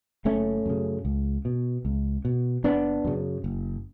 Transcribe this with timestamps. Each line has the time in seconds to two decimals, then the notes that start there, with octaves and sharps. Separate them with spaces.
0.25 F#1 A3 C#4
0.66 F#2 C#3
1.05 C#2
1.45 B2
1.85 C#2
2.25 B2
2.64 F#1 B3 D4
3.05 F#2 C#3
3.44 F#1